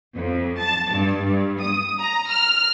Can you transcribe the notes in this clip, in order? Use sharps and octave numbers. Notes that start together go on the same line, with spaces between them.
F2
A5
G2
G2
D#6
A#5
F6